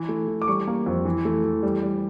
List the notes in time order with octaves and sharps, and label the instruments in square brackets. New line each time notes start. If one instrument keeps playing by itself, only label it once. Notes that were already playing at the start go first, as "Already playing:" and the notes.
Already playing: [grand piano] E3
A3
E3
D6
G3 C#6
A#3
F2
E3
A3
E3
G3
G3